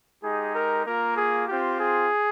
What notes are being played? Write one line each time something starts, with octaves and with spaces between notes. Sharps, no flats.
G#3 D#4 G4 G#4
A#4
A#3 F4 A#4
G#4
C4 F4 G4
G#4